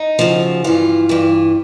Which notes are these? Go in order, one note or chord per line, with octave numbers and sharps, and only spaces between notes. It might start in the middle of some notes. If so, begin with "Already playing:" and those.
Already playing: D#4
F#2 C#3 F3
G2 E3 F4
G2 E3